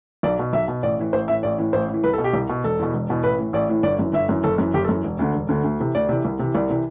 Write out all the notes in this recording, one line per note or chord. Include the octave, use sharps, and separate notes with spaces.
B1 D5
B2
B1 E5
B2
A1 D5
A2 E3
A1 C5
A2 E3 E5
A1 D5
A2 E3
A1 C5
A2
E3
C2 B4
A4
B2
G4
C2
B2
E1 A4
E2 B2
E1
E2 B2
A1 B4
A2 E3
A1 D5
A2 E3
G1 D5
F#2 E3
G1 E5
F#2 E3
F#1 A4
F#2 E3
F#1 G4
A4
F#2 E3
E1
D2 D3
E1
D2 D3
D2
C3 E3
D2 D5
C3 E3
C2
C3 E3
C2 D5
C3 E3